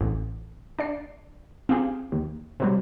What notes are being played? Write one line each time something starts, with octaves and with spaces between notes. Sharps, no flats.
A1
D4 D5 C7
C4 F4 G4 G#4
D#2
C3 F#3 G3